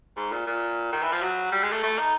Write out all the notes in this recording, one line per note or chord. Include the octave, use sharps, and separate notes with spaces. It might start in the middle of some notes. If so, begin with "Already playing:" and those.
G#2
A#2
A#2
D#3
E3
F3
F#3
G3
G#3
A3
A3
D#4